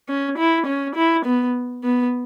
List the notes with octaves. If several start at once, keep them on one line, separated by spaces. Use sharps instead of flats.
C#4
E4
C#4
E4
B3
B3